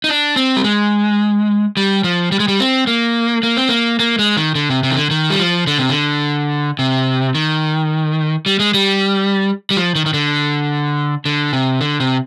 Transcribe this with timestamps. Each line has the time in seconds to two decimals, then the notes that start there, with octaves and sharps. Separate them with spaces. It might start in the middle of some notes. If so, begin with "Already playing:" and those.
0.04 D#4
0.09 D4
0.36 C4
0.56 G3
0.64 G#3
1.77 G3
2.04 F3
2.32 G3
2.40 G#3
2.48 G3
2.60 C4
2.87 A#3
3.43 A#3
3.57 C4
3.69 A#3
3.99 A#3
4.19 G#3
4.37 D#3
4.55 D3
4.70 C3
4.83 C3
4.91 D#3
4.97 D3
5.11 D#3
5.30 G3
5.39 F3
5.67 D3
5.78 C3
5.90 D3
6.79 C3
7.35 D#3
8.46 G3
8.60 G#3
8.74 G3
9.71 G3
9.77 F3
9.95 D#3
10.06 D#3
10.14 D3
11.25 D3
11.53 C3
11.81 D3
12.00 C3